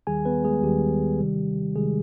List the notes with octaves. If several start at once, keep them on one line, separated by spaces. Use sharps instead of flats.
D#2 D#3 G3 G#4 G#5
B3 B4
G#3 G#4
D#2 D#3 G3 G4
C3 D#3 G3
C3 D#3 G3 G#3 G#4